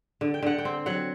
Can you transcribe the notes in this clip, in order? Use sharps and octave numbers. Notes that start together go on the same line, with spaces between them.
D3
G5
D3 F#5
G5
C4
F#3 F#5